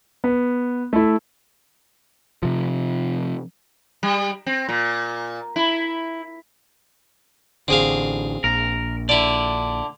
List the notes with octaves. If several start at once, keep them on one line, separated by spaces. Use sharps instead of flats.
B3
A3 E4
C3 F3
G3
C4
A#2
E4
A1 D3 C4 G#4 F5
A#1 A#4
D3 E4 D5